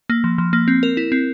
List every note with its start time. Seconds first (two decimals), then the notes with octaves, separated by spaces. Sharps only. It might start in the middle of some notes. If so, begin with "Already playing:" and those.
0.09 A#3
0.24 F3
0.38 F3
0.53 A#3
0.68 C4
0.83 A#4
0.97 E4
1.12 C4